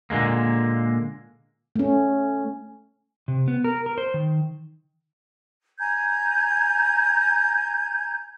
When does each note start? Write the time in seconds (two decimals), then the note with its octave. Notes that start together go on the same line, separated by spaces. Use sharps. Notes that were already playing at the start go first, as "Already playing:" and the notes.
0.10 A#2 D3 G#3 A#3
1.76 A3 C#4
3.28 C3
3.48 B3
3.64 A#4
3.86 A#4
3.98 C5
4.14 D#3
5.79 G#5 A#5 G6 G#6